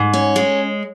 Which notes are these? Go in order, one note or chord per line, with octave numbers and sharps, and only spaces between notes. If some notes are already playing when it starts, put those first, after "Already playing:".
Already playing: G#2
C#4
G#3